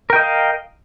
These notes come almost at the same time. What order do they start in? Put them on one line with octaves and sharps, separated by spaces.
A#4 G5 D#5 F5